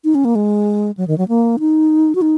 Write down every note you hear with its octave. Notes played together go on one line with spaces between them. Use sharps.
D#4
C#4
A#3
G#3
F#3
D#3
F#3
A#3
D#4
F#4
D#4